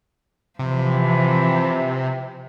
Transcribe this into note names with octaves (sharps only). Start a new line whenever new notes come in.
C3 E3 F3